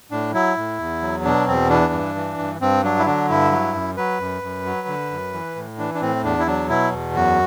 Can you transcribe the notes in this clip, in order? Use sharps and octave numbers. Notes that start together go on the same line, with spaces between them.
A2 D4
F#3 E4
A2
E2
F#3
B2 D4
E2 C4
E3 D4
G2
E3
G2
G2 C4
F#3 D4
E4
D3 D4
G2 E4
F#3
F#2
F#3 B4
F#2
F#2
F#3
D3
F#2
E3
A2
E3 D4
D4
A2 C4
E2 D4
E4
F#3 D4
B2 E4
E2
F#2 F#4